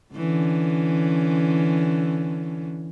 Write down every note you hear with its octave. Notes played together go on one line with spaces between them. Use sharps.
D3 E3 C#4